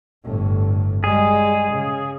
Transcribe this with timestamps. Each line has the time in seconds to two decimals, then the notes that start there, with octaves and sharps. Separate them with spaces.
0.25 G1 A2
1.04 G3 G#3 G#4
1.72 C#3